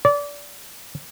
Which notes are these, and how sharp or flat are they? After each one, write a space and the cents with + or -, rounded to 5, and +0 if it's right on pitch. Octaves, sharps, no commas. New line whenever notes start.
D5 -25